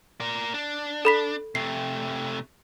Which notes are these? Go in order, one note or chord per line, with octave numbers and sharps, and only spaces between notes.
A#4 D5
D4
A4 B5 B6
C3 A3 C7